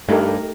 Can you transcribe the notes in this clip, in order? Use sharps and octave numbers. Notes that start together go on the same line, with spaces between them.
G2 A3 D#4 G4 A#4